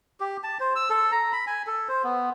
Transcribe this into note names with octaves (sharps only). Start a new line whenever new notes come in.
G4
A5
C5
E6
A4
A#5
B5
G#5
A4
C5
B3